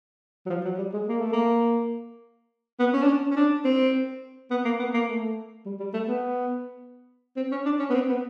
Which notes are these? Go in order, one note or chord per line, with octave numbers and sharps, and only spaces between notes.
F#3
F3
F#3
G3
G#3
A#3
A3
A#3
B3
C#4
D4
C#4
C#4
D4
C4
B3
A#3
B3
A#3
A3
G3
G3
A3
B3
C4
C#4
D4
C#4
B3
C4
B3